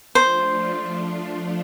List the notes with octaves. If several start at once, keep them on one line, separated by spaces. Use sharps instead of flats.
F3 A3 D4 F4 C5